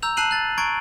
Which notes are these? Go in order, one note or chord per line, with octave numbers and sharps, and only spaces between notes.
A#5 E6 G6 F7
A5 F#6 C7 D#7 F#7
F#6 A6
A#5 C#6 G#6 D7